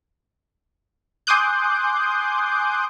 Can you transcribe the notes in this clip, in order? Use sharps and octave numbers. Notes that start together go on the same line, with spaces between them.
G#5 C6 D6 D#6 F#6 G6